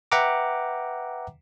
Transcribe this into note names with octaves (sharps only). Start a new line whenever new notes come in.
B4 E5 F#5 G5 A#5 D6